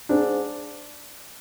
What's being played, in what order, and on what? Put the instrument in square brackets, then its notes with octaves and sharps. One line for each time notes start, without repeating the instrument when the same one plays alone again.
[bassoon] G#2 [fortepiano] D4